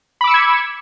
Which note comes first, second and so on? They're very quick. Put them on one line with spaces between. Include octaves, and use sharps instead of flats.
B5 D6 E6 C#7 G#6